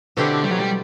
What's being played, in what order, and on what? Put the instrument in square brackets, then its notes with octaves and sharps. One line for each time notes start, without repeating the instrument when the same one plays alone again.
[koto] B2 A3 C4 E4 G4 [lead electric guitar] D3
[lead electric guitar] G3
F#3
G3